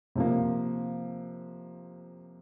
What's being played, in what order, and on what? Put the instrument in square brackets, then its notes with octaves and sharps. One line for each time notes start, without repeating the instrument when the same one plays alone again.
[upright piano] C3 F3 A#3